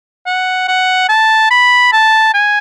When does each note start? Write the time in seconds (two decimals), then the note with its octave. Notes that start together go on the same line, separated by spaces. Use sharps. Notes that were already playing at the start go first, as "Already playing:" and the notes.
0.27 F#5
0.68 F#5
1.09 A5
1.51 B5
1.93 A5
2.34 G#5